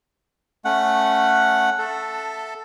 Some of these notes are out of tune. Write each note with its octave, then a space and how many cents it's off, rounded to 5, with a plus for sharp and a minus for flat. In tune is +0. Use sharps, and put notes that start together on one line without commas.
A3 +0 C#4 +0 F#5 +0
A4 +0 E5 +0 A5 +15